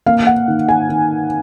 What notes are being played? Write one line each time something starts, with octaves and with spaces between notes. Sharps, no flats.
A#3 F5
F#5
D#3
G#5
D#3